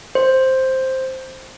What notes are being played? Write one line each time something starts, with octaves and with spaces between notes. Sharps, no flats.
C5